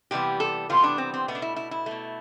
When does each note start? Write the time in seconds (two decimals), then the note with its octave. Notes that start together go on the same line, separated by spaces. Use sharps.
0.11 C3 E3 G3 B3 G4
0.40 A4
0.69 C3 E3 G3 B3 F4
0.83 D4
0.98 C4
1.14 C4
1.28 B2 A3 B3
1.35 D4
1.42 E4
1.56 E4
1.71 E4
1.86 B2 A3